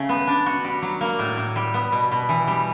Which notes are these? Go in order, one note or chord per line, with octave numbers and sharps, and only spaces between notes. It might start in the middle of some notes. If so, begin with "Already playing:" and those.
Already playing: C#3 A3
B3
D4
F#4
G3
F#3
A#3
A2
A2
G3
B3
B2
B2
E3
G3